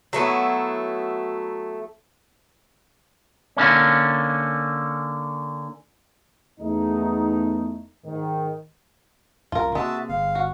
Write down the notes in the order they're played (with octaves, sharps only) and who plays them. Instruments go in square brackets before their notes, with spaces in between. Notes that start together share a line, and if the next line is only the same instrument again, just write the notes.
[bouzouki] F#3 A3 B3 E4
[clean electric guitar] D3 A#3 C#4
[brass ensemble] E2 A3 D#4
G#2 D#3
[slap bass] C2 F#2 [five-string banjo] F4 A#4
[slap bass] C3 A#3 [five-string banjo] G#3 [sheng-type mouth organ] F#4 E5 A5
[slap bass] G1 [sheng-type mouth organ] F5
[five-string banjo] F#4